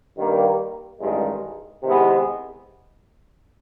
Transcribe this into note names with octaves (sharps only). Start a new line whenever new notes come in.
G2 D#3 G3 A#3
A1 G2 D#3 G#3
C3 D#3 G#3 B3 E4